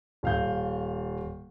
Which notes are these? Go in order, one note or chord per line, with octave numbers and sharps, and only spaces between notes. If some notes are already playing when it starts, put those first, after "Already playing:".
D#1 F5 G6